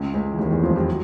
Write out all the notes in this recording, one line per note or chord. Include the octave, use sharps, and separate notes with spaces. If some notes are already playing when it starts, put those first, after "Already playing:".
Already playing: C#2 C#3
C#2 C#3
E3
D#2 D#3
E2 E3
F2 F3
G2 G3
F#3